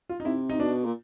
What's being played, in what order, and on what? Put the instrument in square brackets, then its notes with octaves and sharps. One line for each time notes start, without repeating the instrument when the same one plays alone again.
[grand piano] F4
D#4
[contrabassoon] C3 [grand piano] E4
[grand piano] D#4
[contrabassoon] B2 [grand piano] D4
[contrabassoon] A#2